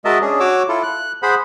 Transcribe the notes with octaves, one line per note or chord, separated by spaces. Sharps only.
G#3 F#4 A#4 D#5 E5 A5
C#4 D4 G#4
F#4 C#5 D6 E6
E4 F4 A4
F#6
G#4 C5 F#5 B5